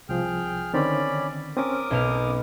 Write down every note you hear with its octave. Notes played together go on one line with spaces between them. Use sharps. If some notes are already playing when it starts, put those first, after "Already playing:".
C2 F3 G#4 G5 F6
D3 D#3 C4 C#4 D5 B5
C4 C#4 A#4 D6 D#6
B1 B2 F6